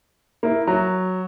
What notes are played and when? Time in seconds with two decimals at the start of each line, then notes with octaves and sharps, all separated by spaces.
0.43 A#3 E4
0.67 F#3